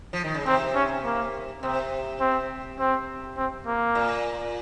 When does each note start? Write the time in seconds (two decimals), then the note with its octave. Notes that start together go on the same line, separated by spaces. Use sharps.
0.13 F3
0.24 D#3
0.35 C#3
0.46 C3 C4
0.75 C#4
1.04 A#3
1.62 C3 C4
2.20 C4
2.79 C4
3.37 C4
3.67 A#3
3.95 A#2